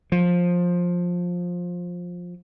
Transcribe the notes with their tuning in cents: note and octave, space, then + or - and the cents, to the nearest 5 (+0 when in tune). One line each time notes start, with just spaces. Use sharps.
F3 +15